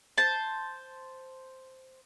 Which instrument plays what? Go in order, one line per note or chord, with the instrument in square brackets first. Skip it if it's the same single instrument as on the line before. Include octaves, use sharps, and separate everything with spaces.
[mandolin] C5 A5